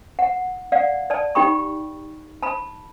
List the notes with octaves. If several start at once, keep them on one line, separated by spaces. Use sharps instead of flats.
F#5
D5 F5 F#5
D5 A5
D#4 G4 G5 B5 C#6
A5 B5